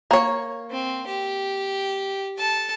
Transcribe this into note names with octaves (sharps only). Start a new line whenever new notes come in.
A#3 C#5
C4
G4
A4 A5